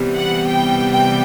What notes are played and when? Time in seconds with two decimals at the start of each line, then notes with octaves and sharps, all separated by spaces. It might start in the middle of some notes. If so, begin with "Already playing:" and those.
Already playing: C3 E3 G3 B3
0.16 F#5
0.47 G5
0.92 G5